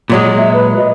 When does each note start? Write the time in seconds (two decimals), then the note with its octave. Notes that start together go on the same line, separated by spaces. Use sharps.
0.10 A#2 F#3 G#3
0.37 E5
0.53 B4
0.77 D#5